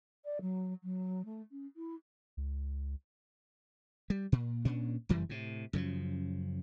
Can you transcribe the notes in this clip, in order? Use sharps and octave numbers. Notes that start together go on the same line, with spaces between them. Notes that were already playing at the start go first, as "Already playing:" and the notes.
D5
F#3
F#3
A3
C#4
E4
C#2
G3
A#2
A#2 C#4 D4
F#1 F#2 E3 G3
A2 C3
F#2 C#3 E3 F3